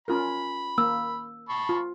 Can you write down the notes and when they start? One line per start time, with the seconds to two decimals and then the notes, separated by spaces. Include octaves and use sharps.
0.08 C#4 F4 A#4 B5
0.78 A#3 E6
1.49 A5 B5 C#6
1.69 F4